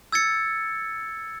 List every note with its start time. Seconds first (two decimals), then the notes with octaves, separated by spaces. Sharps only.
0.12 E6 G#6 A6 C#7